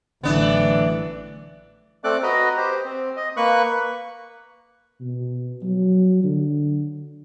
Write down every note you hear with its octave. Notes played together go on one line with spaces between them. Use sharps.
A1 D3 E3 F#3 A3 B3 D4
A3 C4 A4 D5 D6 F#6
F#4 B4 D#5 A#5
G4 C5
C4
D#5
A#3 B4 C#6 F#6
B2
F#3
D3